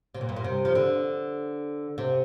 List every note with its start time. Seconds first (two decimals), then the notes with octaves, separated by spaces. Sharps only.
0.14 C3
0.21 A#2
0.29 G2
0.36 A#2
0.44 C3
0.65 F3
0.75 D3
1.98 C3